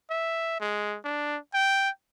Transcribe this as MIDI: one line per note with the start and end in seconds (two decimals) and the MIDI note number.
0.10 0.58 76
0.60 0.97 56
1.05 1.38 62
1.54 1.90 79